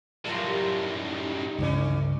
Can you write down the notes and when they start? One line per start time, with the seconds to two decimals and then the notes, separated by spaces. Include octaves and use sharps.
0.25 F#2 A2 G3 A3 F4 A#4
0.72 D#4
1.58 C#2 G2 D3 E3 C#4